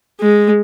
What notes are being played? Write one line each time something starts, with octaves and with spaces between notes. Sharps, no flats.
G#3